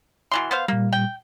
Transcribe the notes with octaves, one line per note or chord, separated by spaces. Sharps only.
B2 E3 C6
B3 C5 F5
A#2 G3 A#3
G5